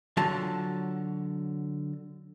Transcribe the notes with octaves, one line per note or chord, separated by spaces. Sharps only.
D3 F#3 F4 A5